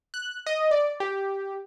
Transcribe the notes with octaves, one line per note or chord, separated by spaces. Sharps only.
F#6
D#5
D5
G4